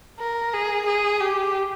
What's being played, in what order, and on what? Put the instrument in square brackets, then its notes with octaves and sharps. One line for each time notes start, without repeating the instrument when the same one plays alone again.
[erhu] A#4
G#4
G#4
G4